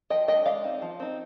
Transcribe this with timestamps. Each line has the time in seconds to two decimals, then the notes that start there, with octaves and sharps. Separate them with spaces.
0.10 F3 D#5 G5
0.28 G#3 D4 D#5 G5
0.45 G#3 D5 F5
0.64 C4 D#4
0.82 F3
1.00 C4 D#4